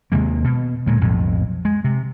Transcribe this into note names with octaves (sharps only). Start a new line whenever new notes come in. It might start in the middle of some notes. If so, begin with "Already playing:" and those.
D#2 C3 G#3 A#3
B2
D2 A#2 G#3
B1 F2 A2
G#3
C3